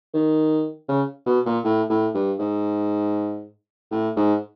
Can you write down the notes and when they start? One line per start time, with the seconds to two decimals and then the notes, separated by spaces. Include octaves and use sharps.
0.14 D#3
0.89 C#3
1.26 B2
1.46 A#2
1.64 A2
1.90 A2
2.14 G2
2.39 G#2
3.91 A2
4.16 G#2